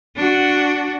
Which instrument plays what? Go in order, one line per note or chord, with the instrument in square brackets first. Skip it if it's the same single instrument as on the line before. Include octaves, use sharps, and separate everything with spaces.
[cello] D4 F#4